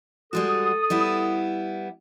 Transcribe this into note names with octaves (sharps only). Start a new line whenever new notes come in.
G3 G#3 F#4 A4 D#6
G3 B3 E4